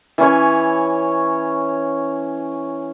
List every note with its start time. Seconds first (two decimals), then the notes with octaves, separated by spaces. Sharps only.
0.18 E3 C#4 C#5